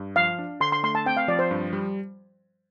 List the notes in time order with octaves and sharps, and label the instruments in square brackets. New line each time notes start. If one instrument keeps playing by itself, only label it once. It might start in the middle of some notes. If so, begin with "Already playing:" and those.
Already playing: [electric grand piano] G2
[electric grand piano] F3 [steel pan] F5
[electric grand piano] D4
[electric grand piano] D3 [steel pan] C6
[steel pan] C6
[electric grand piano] A3 [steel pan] C6
[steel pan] A5
[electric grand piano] C4 [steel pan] G5
[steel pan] F5
[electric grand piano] F3 [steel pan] D5
[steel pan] C5
[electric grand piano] G2
G3